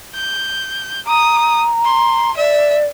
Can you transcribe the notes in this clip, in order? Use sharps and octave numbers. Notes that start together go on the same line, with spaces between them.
G6
A#5 D#6
C6
D5 E5